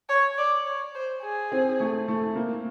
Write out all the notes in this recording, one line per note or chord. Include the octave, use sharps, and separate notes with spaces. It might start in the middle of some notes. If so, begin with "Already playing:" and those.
C#5
D5
C#5
C5
G#4
C4
A3
A3
A#3